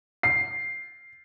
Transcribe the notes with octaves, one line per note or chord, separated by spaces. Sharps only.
C7